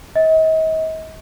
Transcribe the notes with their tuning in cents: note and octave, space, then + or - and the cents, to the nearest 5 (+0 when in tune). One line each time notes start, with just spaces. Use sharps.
D#5 +40